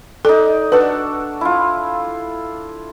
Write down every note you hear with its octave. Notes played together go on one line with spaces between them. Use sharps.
D#4 A4 D5
D4 F#4 A4 B4
E4 F4